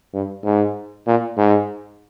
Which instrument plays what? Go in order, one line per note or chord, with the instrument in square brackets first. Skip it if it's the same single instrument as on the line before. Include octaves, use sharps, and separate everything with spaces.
[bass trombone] G2
G#2
A#2
G#2